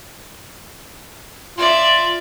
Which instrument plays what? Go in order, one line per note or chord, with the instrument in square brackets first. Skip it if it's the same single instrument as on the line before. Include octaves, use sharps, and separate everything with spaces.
[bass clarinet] F4 [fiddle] D5 E5